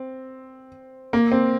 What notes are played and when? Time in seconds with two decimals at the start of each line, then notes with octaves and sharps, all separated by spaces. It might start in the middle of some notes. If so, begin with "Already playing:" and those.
Already playing: C4
1.13 A#3
1.32 C4